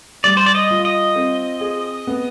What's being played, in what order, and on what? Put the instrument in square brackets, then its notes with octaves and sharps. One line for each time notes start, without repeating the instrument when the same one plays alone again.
[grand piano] G3 [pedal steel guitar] D5
[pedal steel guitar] C5
D5
D#5
[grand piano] F4
[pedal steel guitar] D#5
[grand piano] C4
G#4
B3